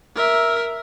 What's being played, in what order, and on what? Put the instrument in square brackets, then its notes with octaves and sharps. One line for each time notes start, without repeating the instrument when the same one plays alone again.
[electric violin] A#4 E5